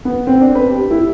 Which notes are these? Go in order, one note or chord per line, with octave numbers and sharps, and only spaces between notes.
B3
C4
D4
B4
G4
E4